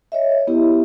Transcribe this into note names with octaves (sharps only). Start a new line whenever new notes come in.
C#5 D#5 E5
B3 E4 G4